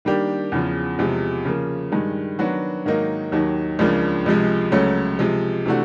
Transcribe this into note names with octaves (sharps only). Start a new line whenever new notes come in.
D#3 G3 A#3 D4 G4
E2 C#3 F3
E2 C3 F3 G#3
C#3 F3 A#3
G2 D#3 G#3
D#3 F#3 B3 D4 F#4
G#2 D#3 F#3 A#3 D#4
D#2 D#3 F#3
C#2 C#3 F3 A#3 D4
C#2 C3 F3 G#3
C#2 C#3 F#3 A3 C#4
C3 F3 G#3
C3 E3 A3 D4 F#4